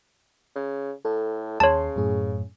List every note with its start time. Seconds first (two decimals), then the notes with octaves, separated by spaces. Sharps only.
0.56 C#3
1.05 A2 A4
1.60 D#2 C#3 C#5 A5 C6
1.96 F#2 A2 G#4